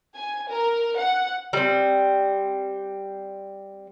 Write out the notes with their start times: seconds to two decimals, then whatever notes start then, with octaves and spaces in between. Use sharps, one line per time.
0.14 G#5
0.49 A#4
0.99 F#5
1.53 G3 C4